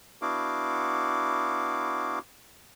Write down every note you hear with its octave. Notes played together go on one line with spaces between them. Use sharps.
B3 D4 E4 F#4 F5 D6